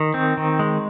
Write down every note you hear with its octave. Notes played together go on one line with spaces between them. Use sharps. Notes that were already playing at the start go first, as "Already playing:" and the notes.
Already playing: D#3
C4
D#3
G#3